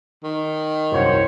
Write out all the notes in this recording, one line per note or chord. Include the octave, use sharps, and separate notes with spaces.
D#3
C2 F#2 C5 C#5